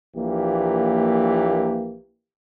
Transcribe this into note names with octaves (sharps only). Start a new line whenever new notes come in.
A#1 A#2 E3 A#3 G4